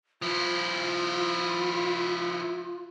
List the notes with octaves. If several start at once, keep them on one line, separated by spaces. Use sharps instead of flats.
F3 E4 F4